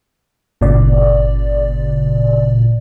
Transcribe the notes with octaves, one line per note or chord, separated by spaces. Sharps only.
G1 A#2 C#3 D5